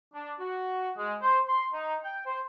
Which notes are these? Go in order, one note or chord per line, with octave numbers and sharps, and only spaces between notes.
D4
F#4
G#3
C5
C6
D#4
G5
C5